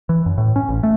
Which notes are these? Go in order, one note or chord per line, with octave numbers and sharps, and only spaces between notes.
E3
F#2
A2
C#4
A1
A3